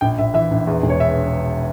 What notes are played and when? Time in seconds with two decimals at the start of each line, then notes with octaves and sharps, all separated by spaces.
0.01 A#1 G5
0.18 A#1 E5
0.34 E3 E5
0.51 A#1
0.67 E2
0.83 E1
0.89 C#5
1.00 E5